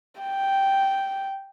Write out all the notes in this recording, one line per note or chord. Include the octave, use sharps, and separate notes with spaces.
G5